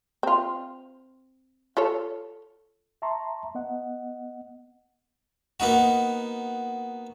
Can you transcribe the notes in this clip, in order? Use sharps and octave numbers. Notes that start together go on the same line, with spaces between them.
C4 F4
F4 A4 C#5
E5 A5 A#5 C6 C#6
B3 D#5 F#5
A#3 B3 D#4 F#4